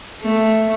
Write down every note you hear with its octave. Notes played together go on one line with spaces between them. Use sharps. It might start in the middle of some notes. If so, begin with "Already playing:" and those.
A3